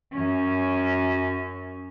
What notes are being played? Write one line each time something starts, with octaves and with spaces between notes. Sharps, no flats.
F#2 C#4